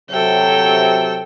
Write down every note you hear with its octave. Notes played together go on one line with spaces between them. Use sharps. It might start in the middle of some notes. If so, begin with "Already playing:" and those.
C3 F#3 A4 G5